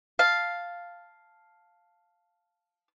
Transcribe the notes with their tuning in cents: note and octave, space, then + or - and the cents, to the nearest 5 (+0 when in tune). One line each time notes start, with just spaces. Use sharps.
F5 +0 A5 +0